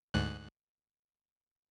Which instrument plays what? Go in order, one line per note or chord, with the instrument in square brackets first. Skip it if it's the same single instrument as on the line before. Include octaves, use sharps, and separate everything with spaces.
[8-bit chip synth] D2 G#2 F#6